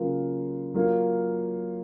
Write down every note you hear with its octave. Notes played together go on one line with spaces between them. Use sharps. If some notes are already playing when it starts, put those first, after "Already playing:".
Already playing: C#3 F#3 A#3 F4 A#4
F#3 A#3 F4 A#4